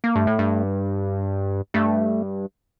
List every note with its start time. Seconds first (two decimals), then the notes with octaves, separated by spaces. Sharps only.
0.04 A#3
0.16 G2 A3
0.27 A2
0.39 G2
1.74 G2 A3